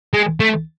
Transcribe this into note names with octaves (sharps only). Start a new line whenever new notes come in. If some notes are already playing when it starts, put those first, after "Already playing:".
G#3
A3